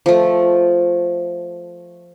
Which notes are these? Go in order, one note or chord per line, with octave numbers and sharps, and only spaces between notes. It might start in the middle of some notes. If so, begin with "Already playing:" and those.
F3 A3